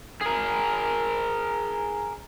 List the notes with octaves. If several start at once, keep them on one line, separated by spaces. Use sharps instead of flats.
G#4 A#4